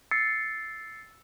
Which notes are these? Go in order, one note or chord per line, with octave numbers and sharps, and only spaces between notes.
E6 A6 C7 C#7